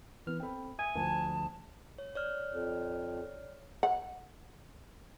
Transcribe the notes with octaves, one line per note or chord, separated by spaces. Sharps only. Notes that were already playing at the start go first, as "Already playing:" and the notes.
E3 B3 F6
C4 A4 G5 B5
E5 G#5 D#6
D2 D3 F3 A5
C#5
C#5 D5 F6
F2
F#5